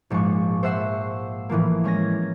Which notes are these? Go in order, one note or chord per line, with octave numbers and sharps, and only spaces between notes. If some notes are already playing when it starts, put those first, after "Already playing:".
A#1 G#2 F3 G#3 C#6
C5 E5 F#5 C#6 E6 C7
A2 E3 F3 A#3
G#3 C#4 G#6 A#6